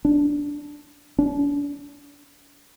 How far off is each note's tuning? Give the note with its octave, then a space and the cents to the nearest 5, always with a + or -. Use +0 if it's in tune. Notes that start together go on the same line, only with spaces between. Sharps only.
D4 -5
D4 -40